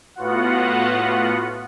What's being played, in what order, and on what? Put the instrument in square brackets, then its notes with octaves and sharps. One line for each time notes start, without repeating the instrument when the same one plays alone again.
[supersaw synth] A2 B3 F4 F#4 F#5